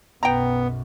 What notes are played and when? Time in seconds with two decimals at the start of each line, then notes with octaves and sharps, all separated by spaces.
0.23 B1 F#2 B3 G5 A#5